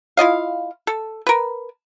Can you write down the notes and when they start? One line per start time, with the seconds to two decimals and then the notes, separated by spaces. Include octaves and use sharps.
0.17 E4 F4 D#5 F5
0.87 A4
1.27 A#4 B4